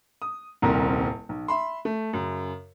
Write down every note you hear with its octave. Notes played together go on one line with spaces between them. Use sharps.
D#6
D#1 C2 C4 A#4
B1
E5 B5 C6
A3
F#2 C#3